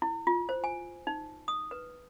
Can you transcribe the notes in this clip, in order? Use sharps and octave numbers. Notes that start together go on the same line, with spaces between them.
E4
F4
C5
G#5
D#4
D#6
B4